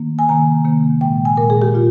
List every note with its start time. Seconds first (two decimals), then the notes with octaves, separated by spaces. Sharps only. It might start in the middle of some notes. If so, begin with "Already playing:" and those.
Already playing: D#3 A#3
0.19 G#5
0.29 C3 D#3 A#3 A#5
0.65 C3 D#3 A#3
1.01 A#2 G#3 G5
1.25 G#5
1.37 A#2 G#3 A#4
1.50 G#4
1.62 G4
1.74 A#2 F4